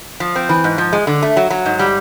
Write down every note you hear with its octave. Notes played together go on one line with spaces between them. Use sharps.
F3
C4
E3
G#2
F3
G#3
D3
A3
F#3
F#3
G#2
G3